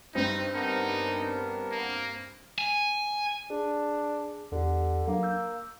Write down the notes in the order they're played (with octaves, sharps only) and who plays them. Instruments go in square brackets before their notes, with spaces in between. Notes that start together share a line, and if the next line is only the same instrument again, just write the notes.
[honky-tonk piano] G2 G3 C4 [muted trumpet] D#4
[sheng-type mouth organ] B3 D4 A#4 [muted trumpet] D#4
[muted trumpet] A#3
[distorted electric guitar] G#5
[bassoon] D4 [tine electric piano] G#4
[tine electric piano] E2 G4 [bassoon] D3
[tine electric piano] F#3 D4 [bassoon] A#3
[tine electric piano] E6 G6